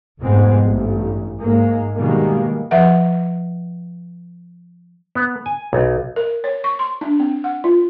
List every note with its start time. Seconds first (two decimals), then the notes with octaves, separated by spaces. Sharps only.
0.20 F1 G#2 G#3 B3 C4
0.62 A1 G2
1.39 G#2 G#3 A#3
1.96 B2 D#3 G3 G#3 A#3
2.71 F3 B4 E5 F#5
5.15 B3
5.46 G#5
5.73 B1
6.16 A#4
6.44 C#5
6.64 C#6
6.79 C6
7.01 D4
7.20 C4
7.44 F#5
7.64 F4